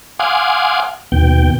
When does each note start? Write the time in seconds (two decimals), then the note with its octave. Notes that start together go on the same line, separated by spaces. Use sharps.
0.19 F5 F#5 G#5 C6 D6 D#6
1.12 D#2 B2 G5